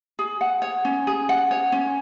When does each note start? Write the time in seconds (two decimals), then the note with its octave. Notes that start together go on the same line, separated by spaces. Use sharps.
0.19 G#4
0.41 F#5
0.62 C#5
0.85 C#4
1.07 G#4
1.29 F#5
1.51 C#5
1.72 C#4